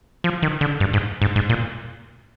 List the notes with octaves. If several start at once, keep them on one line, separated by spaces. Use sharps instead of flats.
F3
D#3
D3
G2
G#2
G#2
G#2
A#2